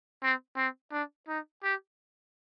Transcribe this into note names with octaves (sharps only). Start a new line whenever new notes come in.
C4
C4
D4
D#4
G4